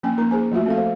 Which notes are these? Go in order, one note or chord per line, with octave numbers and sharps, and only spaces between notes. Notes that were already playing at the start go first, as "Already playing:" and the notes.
F3 A#3 C#4 G5 G#5
A#3 D#4 A#4 A#5
G#4 C5 G#5
F3 A3 F4 F#4 E5
C4 A4 F5
C5